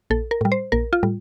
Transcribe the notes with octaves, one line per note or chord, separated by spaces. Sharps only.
A#1 A4
A#4
A2 G3
C5
A#1 A#4
F4
A2 G3